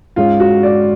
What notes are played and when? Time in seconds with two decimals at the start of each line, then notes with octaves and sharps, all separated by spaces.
0.16 G#2 G#3 C#4 F4
0.40 F#4
0.63 D5